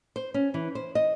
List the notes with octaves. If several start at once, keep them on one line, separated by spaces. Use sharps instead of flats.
C5
C#4
E3
C5
D#5